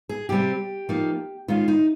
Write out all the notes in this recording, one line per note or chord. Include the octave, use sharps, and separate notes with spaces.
G#4
C3 G3 C4 G4
F3 A#3 D#4
D#3 G#3 C#4 F4
D#4